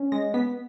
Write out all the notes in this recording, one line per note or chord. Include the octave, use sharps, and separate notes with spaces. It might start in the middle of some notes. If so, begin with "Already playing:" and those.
Already playing: C#4
G#3 A#6
B3 B6